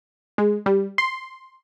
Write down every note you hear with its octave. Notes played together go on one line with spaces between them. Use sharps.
G#3
G3
C6